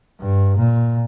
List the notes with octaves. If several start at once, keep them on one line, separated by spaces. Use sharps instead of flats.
G2
A#2